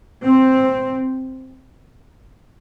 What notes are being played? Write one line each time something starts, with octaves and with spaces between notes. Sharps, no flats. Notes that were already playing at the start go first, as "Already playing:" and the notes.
C4